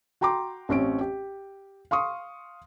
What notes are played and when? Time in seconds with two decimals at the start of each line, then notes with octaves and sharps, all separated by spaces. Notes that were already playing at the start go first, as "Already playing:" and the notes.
0.21 F#4 G5 A#5 C6 D6
0.69 A1 C4 C#4 D7
1.01 G4
1.91 F5 C6 C#6 D#6